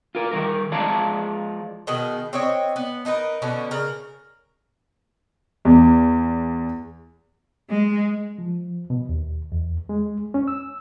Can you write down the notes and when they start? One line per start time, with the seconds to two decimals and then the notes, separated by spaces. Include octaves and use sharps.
0.15 F4 A#4
0.31 D#3 G3 A#4
0.72 F3 G#3 D5 F5 A5 A#5
1.87 B2 D#3 G#4
2.33 C4 D4 C#5 D#5
2.76 B3
3.05 D4 D#4 A#4 B4
3.42 B2 D3 C#4
3.71 C#3 A#4
5.65 E2
7.70 G#3
8.39 F3
8.90 B2
9.09 D#2
9.52 E2
9.89 G#3
10.34 C#4
10.48 E6